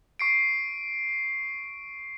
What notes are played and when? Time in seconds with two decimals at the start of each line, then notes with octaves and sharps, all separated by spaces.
0.19 C#6 C7 D7